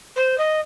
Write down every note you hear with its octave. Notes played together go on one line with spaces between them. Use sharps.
C5
D#5